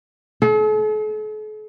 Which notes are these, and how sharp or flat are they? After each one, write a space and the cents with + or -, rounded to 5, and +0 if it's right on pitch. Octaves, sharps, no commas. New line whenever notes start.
A4 -45